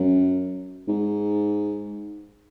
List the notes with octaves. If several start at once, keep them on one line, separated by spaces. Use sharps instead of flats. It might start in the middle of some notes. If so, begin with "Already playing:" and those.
Already playing: F#2
G#2